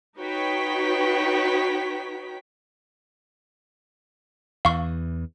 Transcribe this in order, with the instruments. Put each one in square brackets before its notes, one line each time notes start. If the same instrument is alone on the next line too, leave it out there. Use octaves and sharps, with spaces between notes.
[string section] D#4 F#4 B4 C#5 G5 B6
[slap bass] E2 E3 [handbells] F5 C#6